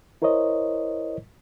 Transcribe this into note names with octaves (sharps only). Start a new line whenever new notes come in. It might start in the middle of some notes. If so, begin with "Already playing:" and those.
E4 A#4 C5 C#5 D#5